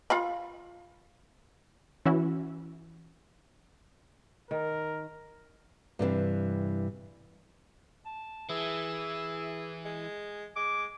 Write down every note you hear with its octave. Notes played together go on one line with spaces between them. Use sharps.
F4 F5 B5
E3 C#4 E4 F#4
D#3 A#4
G2 C3 D#3 E3
A5
E3 G#4 E5
G#3
G#3 D6